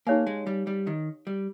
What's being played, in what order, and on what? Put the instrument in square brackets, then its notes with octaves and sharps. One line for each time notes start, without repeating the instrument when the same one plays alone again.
[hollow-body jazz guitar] A#3 [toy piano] D#4 G4 C#5 F5 G#5
[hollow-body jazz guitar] G#3
G3
G3
D#3
G3